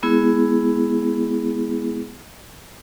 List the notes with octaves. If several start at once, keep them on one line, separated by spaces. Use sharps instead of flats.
G#3 B3 E4 G#4